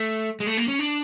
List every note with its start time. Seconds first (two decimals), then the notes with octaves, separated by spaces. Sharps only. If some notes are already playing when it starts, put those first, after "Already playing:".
Already playing: A3
0.40 G#3
0.47 A3
0.57 A#3
0.68 C#4
0.79 D4